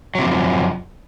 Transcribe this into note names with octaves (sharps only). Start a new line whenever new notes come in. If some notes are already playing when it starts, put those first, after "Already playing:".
F#2 C3 F3 F#3